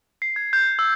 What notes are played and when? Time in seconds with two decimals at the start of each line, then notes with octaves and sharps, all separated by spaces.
0.22 C7
0.36 G#6
0.53 G6
0.79 E6